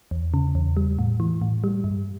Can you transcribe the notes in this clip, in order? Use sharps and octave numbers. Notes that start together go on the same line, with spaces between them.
E2
C#3
E2
G3
A2
E3
A2
G3
G2